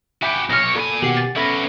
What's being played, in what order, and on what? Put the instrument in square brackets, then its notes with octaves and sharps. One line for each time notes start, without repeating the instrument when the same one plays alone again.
[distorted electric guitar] F#4 G4 [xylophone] E5 [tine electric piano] G#5 B5
[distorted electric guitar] B1 C#5 [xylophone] F6 A#6
[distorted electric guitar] A#2 G#5 [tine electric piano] A4 B5
[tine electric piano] B2 D#3 G4 [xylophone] F#5 C7 F#7
[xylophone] A6
[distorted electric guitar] B3 C#4 [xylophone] A4 B5 A#6 [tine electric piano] E5